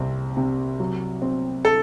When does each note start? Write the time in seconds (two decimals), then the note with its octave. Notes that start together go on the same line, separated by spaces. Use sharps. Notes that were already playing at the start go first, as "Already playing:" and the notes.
Already playing: C2 C4
0.37 C3
0.80 F#3
1.22 C4
1.65 A4